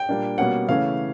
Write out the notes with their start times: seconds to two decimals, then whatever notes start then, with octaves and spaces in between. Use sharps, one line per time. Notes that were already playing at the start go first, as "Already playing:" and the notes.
Already playing: G5
0.09 A#2 G3 A#3 D4
0.38 B2 G3 A#3 C#4 F#5
0.69 C#3 E3 A3 C#4 F5